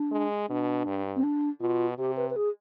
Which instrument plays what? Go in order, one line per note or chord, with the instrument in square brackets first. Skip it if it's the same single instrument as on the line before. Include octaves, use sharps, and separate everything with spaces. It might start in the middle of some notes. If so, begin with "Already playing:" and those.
Already playing: [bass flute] D4
[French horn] G#3
[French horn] B2 [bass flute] D4
[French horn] G2
[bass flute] C4
D4
[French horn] B2 [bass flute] F4
[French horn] C3 [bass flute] G4
[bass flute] B4
B4
G#4